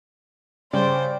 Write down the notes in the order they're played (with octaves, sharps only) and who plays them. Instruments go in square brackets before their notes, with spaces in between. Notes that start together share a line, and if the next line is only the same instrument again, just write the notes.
[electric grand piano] C#3 [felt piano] G3 [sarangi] C5 [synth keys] D5 G5